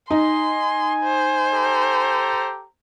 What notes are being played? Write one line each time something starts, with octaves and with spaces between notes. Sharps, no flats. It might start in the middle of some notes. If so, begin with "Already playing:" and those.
D#4 G#5 C6
C5
G4 A4 A#5